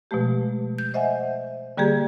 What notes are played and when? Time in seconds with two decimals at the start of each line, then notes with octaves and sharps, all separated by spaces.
0.11 B2 F3 G#3 A3 G4
0.78 G6
0.94 C5 D#5 E5 F#5 G#5
1.77 D3 G3 A#3 G4 G#4